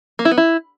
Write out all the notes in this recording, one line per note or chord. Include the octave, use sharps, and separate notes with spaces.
A#3
E4
B3
E4